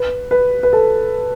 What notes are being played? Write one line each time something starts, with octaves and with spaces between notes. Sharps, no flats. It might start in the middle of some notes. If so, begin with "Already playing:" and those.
Already playing: B4
B4
B4
A4